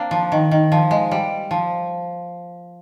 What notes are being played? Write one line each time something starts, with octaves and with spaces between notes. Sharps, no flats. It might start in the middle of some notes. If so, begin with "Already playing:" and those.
Already playing: A#3 C4 D4
F3
D#3
D#3
F3
G#3
G3
F3